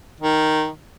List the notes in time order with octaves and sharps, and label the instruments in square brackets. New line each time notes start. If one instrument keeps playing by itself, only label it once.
[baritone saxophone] D#3